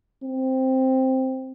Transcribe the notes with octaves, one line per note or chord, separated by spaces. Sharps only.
C4